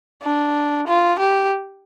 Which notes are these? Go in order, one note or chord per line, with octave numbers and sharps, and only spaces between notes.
D4
F4
G4